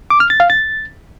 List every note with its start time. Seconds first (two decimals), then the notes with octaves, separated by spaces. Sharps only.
0.10 D6
0.20 F6
0.30 A6
0.40 F5
0.50 A6